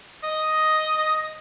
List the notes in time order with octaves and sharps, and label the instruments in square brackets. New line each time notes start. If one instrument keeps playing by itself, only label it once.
[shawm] D#5